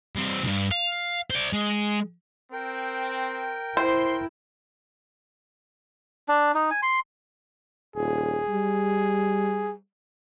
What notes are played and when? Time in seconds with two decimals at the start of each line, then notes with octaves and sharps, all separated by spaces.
0.16 G2 C4
0.43 B1 G2
0.71 F5
1.30 C5 D5
1.53 G#3
2.52 C4 A#4 G5
3.77 E4 C5 C6
6.29 D4
6.55 D#4
6.71 G#5
6.83 C6
7.96 D#1 G#4
8.49 G3